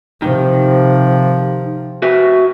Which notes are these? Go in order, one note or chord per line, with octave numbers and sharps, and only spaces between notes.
C3 D#3 F3
F#4 B4 E5